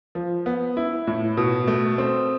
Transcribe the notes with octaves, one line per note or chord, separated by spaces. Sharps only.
F3
B3
E4
A2
B2
A3
C4